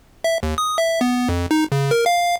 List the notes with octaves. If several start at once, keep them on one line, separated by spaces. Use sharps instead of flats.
E5
D#2
D#6
E5
B3
F2
D#4
C#3
A#4
F5